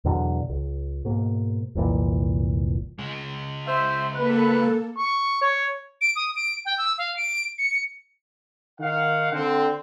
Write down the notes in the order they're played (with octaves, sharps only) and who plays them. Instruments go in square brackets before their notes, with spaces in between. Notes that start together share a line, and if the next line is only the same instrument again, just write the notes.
[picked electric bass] E2 B2 D3 F#3
C#2
G#2 B2 A#3
F1 C2 A#2 E3
[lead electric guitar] C#3 G#3
[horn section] C5 E5
[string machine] A#3 A4 [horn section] B4
[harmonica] C#6
C#5
[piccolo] D7
D#6
D7
G5
E6
F5
D7
C#7
[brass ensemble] D#3 F5 F#5
D3 C4